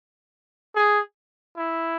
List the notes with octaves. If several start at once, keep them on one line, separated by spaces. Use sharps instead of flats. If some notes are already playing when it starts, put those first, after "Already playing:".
G#4
E4